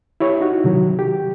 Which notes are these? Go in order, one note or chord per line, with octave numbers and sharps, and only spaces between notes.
E4 G4 C#5
D#4 F#4
C3 D#3 F#3
G4